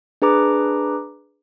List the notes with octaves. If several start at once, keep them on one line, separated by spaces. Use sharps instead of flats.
D4 G#4 B4 A#5 D6